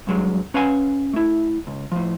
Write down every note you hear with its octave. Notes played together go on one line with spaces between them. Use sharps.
G2 F#3 G#3
C#4 B4 F5 F#5 G#5
A3 E4
C#2
A2 F3